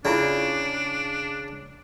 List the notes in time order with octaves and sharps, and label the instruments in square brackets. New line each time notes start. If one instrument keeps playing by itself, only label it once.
[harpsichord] C#3 [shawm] D4 [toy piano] E4 F4 D5